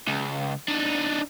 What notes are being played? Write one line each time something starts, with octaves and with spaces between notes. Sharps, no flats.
C#2
D4 D#4